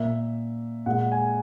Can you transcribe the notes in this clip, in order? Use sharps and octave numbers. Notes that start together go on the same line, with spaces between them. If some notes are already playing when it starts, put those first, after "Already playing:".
Already playing: A#2 A#3 E5
A#2 G#3 F#5
G#5